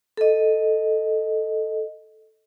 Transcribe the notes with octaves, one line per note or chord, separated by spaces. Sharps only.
A4 D#5